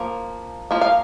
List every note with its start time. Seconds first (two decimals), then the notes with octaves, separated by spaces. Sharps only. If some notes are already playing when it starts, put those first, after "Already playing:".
Already playing: F3 A#3
0.71 F3 A#3
0.81 F5